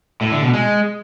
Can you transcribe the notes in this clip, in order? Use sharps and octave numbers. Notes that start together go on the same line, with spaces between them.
A2
D3
B2
G#3